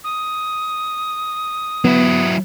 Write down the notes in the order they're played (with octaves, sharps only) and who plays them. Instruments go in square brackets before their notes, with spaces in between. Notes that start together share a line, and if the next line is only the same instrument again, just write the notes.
[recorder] D#6
[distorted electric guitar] F#3 E4 [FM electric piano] B3